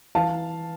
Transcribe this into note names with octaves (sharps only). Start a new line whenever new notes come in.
E3 F5 A5